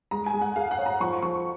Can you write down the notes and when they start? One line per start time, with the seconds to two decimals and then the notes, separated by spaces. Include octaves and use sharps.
0.11 G#3 A#5
0.26 G#5
0.33 G#3
0.42 F#5
0.56 G#4 F5
0.71 F#5
0.78 C#5
0.86 A#5
1.00 F3 C#6
1.22 F3 C#6